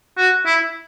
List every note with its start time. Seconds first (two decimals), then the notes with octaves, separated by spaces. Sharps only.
0.18 F#4
0.46 E4